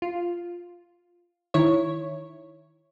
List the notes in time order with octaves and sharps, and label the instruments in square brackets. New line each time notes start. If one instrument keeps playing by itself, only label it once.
[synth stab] F4
D#3 E4 C#5